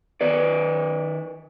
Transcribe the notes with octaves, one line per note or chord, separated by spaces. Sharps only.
D#3 B4 D5